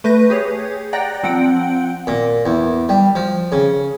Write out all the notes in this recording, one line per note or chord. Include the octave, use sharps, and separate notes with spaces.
A3 B4 G6 A#6 D#7
G4 G#4 C#5
D5 F#5 G5 A#5 F#6 A#6
F3 C4 F#5 G5 D7
A#2
E2
G3
F3
C#3